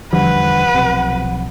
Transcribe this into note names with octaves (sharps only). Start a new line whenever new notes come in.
E2 D3 F3 G3 B4 F#5
B1 C3